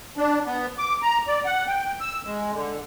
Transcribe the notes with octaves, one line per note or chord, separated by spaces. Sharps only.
D4
B3
D6
A#5
D5
F#5
G5
E6
G#3
D3